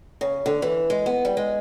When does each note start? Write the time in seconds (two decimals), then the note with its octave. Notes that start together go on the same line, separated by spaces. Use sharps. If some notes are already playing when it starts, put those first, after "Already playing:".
0.21 C#3
0.46 D3
0.62 E3
0.90 G#3
1.06 B3
1.25 G3
1.37 G#3